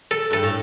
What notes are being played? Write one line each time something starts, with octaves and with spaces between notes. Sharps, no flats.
A4
G2 A4
A2